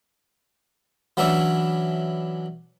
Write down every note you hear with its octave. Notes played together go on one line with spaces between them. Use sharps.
E3 F#3 C#4 D4 E5